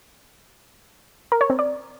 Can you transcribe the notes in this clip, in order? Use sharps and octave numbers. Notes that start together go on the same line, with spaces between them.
A#4
C#5
C4
D5